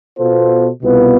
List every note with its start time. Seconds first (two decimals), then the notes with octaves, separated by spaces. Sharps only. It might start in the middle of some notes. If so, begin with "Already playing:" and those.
0.18 B2 B3 F4 A4 C5
0.82 C2 B2 B3 F4 B4